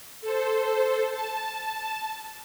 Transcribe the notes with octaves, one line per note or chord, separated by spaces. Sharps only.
A4 C5
A5